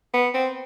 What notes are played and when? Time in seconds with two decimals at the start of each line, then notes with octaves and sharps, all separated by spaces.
0.14 B3
0.34 C4